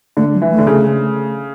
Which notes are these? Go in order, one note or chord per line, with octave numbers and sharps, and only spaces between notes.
D3 A3
F#3
E3
A3
D3
C#3